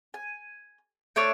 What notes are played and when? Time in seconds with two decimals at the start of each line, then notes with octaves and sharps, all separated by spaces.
0.14 G#5
1.16 A3 D4 C#5